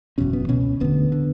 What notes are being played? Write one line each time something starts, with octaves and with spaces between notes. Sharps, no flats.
F#1 E2 B2 C#4
B3
C#2 B2 C#4
E1 D2 D3 B3
D3